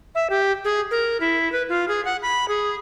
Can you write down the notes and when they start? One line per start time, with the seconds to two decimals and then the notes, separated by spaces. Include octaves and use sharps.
0.15 E5
0.30 G4
0.65 G#4
0.91 A#4
1.20 E4
1.52 B4
1.69 F4
1.88 G#4
2.05 F#5
2.22 B5
2.48 G#4